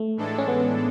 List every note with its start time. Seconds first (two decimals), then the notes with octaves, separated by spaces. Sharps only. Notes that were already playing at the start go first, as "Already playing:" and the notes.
Already playing: A3
0.16 A2 E3 G#3 D4 A4
0.38 C#4
0.48 B3